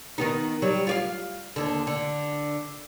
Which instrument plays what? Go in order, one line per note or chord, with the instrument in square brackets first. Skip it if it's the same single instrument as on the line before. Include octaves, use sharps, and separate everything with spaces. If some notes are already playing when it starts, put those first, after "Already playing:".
[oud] D#3 B3 D#4
F#3 G3
F4 D5 F5
D#2 D3
D3